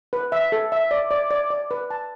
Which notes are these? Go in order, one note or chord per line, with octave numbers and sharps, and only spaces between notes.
B4
E5
A4
E5
D5
D5
D5
D5
B4
A5